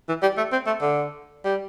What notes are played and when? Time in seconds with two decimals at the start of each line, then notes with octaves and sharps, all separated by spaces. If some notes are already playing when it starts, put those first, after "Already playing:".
0.09 E3
0.23 G3
0.37 A3
0.52 C4
0.66 A3
0.81 D3
1.45 G3